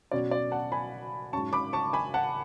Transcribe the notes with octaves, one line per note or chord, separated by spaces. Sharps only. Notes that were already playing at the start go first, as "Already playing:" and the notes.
B2 F#3 C#4 D5
D5
F#5 A5
G#5 B5
G#2 F#3 C#4 A5 C#6
B5 D6
A5 C#6
G#5 B5
F#5 A5